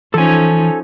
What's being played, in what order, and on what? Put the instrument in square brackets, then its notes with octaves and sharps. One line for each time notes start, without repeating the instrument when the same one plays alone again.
[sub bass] E3 [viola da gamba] F3 C#4 D#4 [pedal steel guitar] A4 G#5